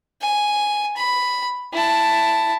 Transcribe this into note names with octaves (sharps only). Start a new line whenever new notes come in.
G#5
B5
E4 A5